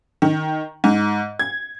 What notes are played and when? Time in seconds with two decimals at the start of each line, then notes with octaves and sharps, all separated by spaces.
0.22 D#3
0.84 G#2
1.39 G#6